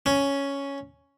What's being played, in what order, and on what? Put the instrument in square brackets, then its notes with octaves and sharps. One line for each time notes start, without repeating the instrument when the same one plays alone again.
[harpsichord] C#4